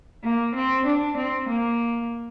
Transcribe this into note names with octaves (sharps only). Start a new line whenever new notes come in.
A#3
C4
D4
C4
A#3